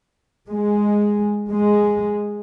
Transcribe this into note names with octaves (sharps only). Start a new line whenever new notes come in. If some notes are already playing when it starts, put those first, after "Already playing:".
G#3
G#3